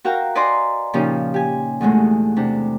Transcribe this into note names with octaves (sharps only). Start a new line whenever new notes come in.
F#4 A#4 F5 G5 A#5
B4 D5 D#5 G#5 A#5 C6
A#2 C#3 F3 C#4 D#4 G4
G4 G#5
E2 B2 G#3 A3
C3 D4